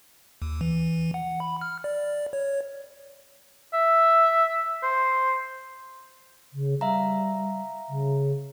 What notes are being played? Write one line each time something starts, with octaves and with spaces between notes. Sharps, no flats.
D#2
E3
F#5
B5
F6
D5
C#5
E5
C5
C#3
G3 E5 F5 A#5
C#3